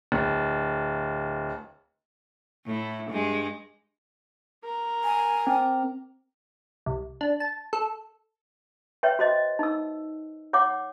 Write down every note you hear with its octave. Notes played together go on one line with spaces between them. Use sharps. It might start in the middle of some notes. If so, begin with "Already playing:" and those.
D1
A2 E4
G2 G#3
A#4
G#5
C4
C2
D4
A5
A4
B4 C#5 E5 G5
F#4 C5 D#5
D#4 E6
C#5 F#5 D6